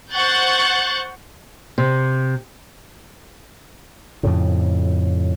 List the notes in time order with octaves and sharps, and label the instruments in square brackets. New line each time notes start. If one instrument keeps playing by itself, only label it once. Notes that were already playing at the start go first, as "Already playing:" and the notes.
[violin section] C5 F#5 C#6 F#6 G6 A6
[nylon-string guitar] C3
[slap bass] F2 A2 C#3